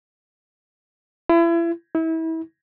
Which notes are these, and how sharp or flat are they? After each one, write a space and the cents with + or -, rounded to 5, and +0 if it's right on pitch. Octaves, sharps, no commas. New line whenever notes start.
E4 +35
E4 -30